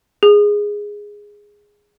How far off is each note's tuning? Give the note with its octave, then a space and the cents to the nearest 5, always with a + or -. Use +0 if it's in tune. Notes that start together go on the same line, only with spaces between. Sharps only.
G#4 -5